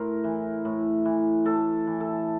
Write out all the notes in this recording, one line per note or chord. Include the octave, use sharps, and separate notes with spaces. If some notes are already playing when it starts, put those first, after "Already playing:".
Already playing: A2 A#4 C5
E3
A2
E3
A2 A4
E3
A4